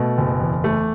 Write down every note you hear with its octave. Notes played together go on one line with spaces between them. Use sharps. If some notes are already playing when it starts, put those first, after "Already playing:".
Already playing: B2 A3
F#1
E2
A3